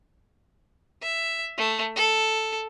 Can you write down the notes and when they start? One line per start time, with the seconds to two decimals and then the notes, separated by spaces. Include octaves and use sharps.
1.02 E5
1.58 A3
1.96 A4